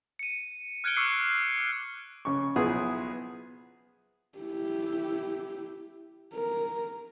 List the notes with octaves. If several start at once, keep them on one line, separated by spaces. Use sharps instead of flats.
C#7 D#7
F6 F#6 G#6 C#7 D7 G7
C#6 D6 E6 F6 C7 C#7
C#3 C#6
B1 F3 B3 E4 G#4
E4 G4
A#4